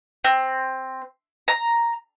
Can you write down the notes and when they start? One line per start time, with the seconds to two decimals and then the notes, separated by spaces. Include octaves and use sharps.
0.24 C4
1.48 A#5